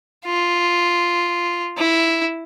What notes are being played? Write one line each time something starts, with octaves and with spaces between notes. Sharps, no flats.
F4
E4